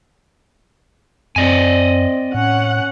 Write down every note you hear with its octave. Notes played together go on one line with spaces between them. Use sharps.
F#2 C4 D5 D#5 G#5
A2 C#4 F#5